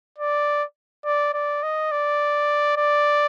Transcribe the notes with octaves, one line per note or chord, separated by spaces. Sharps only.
D5
D5
D5
D#5
D5
D5